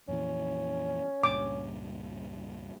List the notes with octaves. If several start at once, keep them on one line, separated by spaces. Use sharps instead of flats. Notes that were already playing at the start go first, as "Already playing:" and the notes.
F2 A#2 E3 C#4
C#2 G2 A#2 D6